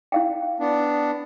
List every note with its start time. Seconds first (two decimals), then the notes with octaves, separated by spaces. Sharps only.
0.12 E4 F5 G5
0.60 B3 D4